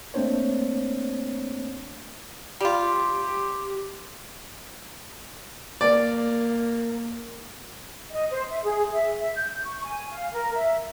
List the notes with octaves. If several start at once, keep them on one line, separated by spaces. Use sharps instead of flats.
A3 A#3 C4 D4 C5 C#5
G3 F4 G4
A#3 D5
D#5
C5
E5
G#4
E5
E5
G6
C#6
G#5
F5
A#4
E5